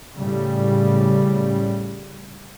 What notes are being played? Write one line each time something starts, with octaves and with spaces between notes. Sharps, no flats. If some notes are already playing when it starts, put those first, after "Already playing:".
A2 C#3 G3